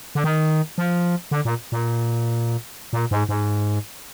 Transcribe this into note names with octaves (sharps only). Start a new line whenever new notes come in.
D3
D#3
F3
D3
A#2
A#2
A#2
G#2
G#2